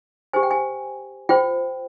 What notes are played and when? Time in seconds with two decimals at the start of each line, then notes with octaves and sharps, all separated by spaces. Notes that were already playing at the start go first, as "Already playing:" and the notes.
0.33 G4 C5 G#5
0.43 G5
0.51 G#5
1.29 F4 C5 G5